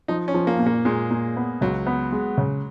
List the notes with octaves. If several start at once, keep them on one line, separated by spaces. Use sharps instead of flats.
F3 D#4
C#4
F3
A#3
A#2
A#3
A#2 G#3
A#2
B3
C#2 F#3
B3
G#3
C#3